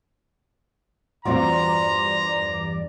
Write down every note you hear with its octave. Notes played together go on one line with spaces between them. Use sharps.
E2 G2 C4 F4 F#4 D5 A#5 C6